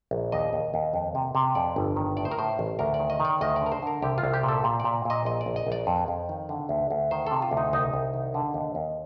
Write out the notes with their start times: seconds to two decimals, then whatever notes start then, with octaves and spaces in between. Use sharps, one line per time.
0.11 A#1
0.32 D#2 D#5
0.53 D#2
0.74 D#2
0.94 F2
1.15 C3
1.35 C3
1.55 F2 D5
1.76 G1
1.96 D#3
2.17 A2 D5
2.25 C5
2.31 A#4
2.39 A2 C5
2.59 A1
2.79 D2 A#4
2.94 D5
3.00 D#3
3.10 D#5
3.20 D#3
3.25 D5
3.41 D2 D#5
3.56 D5
3.61 D3
3.66 A#4
3.72 C5
3.82 D3 A#4
4.02 C2 G4
4.18 F4
4.23 C2
4.34 G4
4.43 A#2
4.48 A4
4.64 A#2
4.80 A#2 D5
5.05 A#2 D#5
5.25 A#1 D#5
5.41 D5
5.46 A#1
5.56 D#5
5.67 A#1
5.72 D5
5.87 F2
6.08 F2
6.29 D#3
6.49 D3
6.69 D2
6.90 D2
7.11 D#3 C5
7.27 C3 A4
7.42 F4
7.51 D2
7.57 D#4
7.73 C2 D#4
7.93 C2
8.14 D#3
8.34 D3
8.54 D#2
8.75 D#2